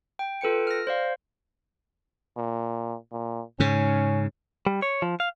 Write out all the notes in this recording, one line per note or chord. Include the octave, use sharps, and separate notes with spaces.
G5
F4 A4 B4 G5 C#7
F6 A#6
C5 D5 F5
A#2
A#2
G#2 C#3 C#4
G3
C#5
F3
F5